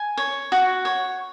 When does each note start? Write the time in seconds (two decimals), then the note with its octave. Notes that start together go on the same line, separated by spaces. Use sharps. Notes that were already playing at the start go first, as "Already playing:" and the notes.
Already playing: G#5
0.17 C#5
0.52 F#4
0.85 C#5